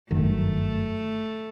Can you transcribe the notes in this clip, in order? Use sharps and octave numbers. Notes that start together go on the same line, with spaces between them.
G1 F#2 D#3 A3